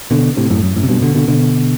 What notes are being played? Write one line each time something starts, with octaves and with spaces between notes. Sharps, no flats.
B2 D3
A2 C3
F#2 A2
F#2
F#2 A2
C3
G2 B2
B2 D3
B2 D3
B2 D3